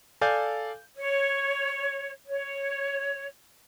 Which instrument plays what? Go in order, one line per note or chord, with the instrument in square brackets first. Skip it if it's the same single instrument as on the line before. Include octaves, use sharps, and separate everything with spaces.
[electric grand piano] A4 D5 F5 G#5 G6
[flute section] C#5
C#5